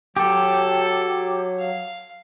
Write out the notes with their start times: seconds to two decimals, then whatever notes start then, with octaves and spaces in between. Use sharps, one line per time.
0.17 F#3 G4 A4
1.59 F5